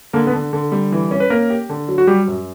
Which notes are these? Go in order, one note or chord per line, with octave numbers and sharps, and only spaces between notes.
D3 A#3 A#4
B3 B4
D3
D3
G3
E3
C#4
B4
A#3 C#4 A#4
G4
D3
F#3
F#4
F#3 G3 G4
F#2